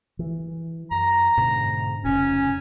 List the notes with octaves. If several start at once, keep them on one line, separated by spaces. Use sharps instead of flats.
E3
F#2 A#5
G#2 B2 D3
F1 C#3 C#4